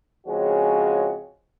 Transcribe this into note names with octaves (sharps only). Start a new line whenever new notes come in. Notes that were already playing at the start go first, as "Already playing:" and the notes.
C#3 F3 G#3 C4 C#4 F#4